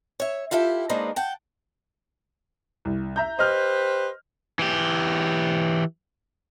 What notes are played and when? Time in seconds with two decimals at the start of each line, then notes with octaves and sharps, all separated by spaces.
0.20 C#5 E5
0.51 E4 F4 G4 A4 E5
0.89 G#3 A#3 D4 D#4 B4 C5
1.16 F#5 G5 A5
2.85 C2
3.16 E5 A#5 G6
3.39 G4 B4 C5 D#5 F6 G6
4.59 E3 G4